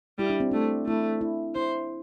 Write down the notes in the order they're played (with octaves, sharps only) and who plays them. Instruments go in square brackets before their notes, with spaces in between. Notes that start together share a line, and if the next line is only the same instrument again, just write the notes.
[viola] G3 [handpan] E4
[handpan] D4
C4
[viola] A3 [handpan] D4
[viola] A3 [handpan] E4
[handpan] E4
[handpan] E4 [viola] C5